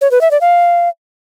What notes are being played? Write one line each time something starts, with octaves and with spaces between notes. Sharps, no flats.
C#5
B4
E5
D5
F5